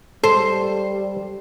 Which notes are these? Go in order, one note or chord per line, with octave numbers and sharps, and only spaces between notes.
G3 A4 C5